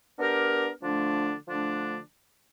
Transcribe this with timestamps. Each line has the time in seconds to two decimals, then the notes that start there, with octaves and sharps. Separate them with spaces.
0.18 B3 D4 G4 A#4
0.82 D3 F3 A3 D4
1.48 D3 F3 A3 D4